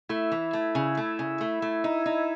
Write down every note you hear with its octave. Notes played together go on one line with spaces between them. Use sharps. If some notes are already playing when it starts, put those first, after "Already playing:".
A3 E4
E3
A3
C#3
A3
C#3
A3
A3
D#4
D#4